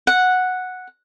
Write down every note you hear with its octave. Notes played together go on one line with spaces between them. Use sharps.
F#5